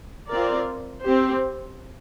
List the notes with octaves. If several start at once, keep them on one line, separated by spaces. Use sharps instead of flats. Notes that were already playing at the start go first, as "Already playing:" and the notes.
C4 F4 A#4 D5
C4 G4 C5